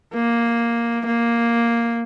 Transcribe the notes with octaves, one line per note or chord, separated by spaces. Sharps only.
A#3
A#3